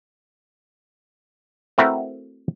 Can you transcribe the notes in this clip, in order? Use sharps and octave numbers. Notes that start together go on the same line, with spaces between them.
A3 C4 E4 F#4 A#4 B4